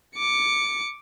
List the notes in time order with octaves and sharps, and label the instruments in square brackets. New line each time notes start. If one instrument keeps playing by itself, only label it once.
[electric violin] D6 C#7